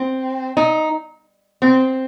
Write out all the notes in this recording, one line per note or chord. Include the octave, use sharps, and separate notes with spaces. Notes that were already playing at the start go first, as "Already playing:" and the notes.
Already playing: C4
D#4
C4